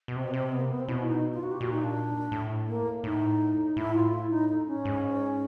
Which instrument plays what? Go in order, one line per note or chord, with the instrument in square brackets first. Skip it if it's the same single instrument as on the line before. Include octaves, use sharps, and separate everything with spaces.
[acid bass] B2
[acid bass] C3 [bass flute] C4
[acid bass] B2
[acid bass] C3 [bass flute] C4
[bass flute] B3
A#3
B3
C4
[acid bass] B2 [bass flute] E4
[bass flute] D#4
F4
F#4
G4
[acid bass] A#2 [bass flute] F#4
[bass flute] D#4
D4
[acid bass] A2
[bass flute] A#3
[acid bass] A2 [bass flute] D#4
[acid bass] A2 [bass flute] E4
[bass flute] F4
E4
D#4
D#4
C#4
[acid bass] G#2